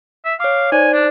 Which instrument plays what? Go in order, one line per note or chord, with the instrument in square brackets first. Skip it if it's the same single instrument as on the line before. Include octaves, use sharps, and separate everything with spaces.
[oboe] E5
[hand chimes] C#5 D6 [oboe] F5
[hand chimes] D#4 C5 D5 [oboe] G#5
[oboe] D4 [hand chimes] D5